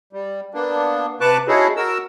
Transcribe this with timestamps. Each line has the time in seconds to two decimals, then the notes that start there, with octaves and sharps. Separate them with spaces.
0.13 G3
0.54 A#3 B3 D4
1.21 C3 B4 A5 C#6 D6 F#6
1.48 C#4 D#4 E4 F#4 G#4 A4
1.77 F#4 A#4 E6